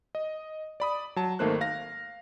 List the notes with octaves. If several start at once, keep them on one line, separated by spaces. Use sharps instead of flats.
D#5
D5 B5 D#6
F#3 A5
G#1 D#3 A3 A#3 C5 F#6
F5 A#6